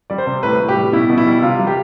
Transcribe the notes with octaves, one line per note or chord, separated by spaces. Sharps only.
G3 D5
C5
C3
A2 B4
A2
G4
G3
B2 E4
B2
E4
G3
C3 F4
G3
G4